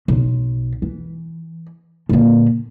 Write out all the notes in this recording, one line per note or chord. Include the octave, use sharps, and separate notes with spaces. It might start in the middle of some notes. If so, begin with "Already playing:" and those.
B1
E3
A#2 D3